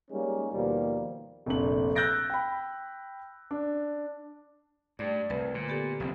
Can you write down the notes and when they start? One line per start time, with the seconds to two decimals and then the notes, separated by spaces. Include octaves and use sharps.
0.11 G3 G#3 A#3 C#4 D#4
0.52 D#2 B2 F3 G3 A#3
1.46 F1 A#1 D4 F#7
1.95 E6 F#6 G6 A6 A#6 D7
2.30 G5 B5
3.51 D4
4.99 G2 A3 D5
5.30 C2 B4
5.54 A#2 D3
5.68 B3 G4 A4
6.00 F1 A#1 C4